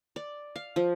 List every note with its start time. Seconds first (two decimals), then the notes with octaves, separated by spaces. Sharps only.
0.16 D5
0.56 F5
0.76 F3